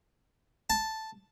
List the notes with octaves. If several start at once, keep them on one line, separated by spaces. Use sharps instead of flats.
A5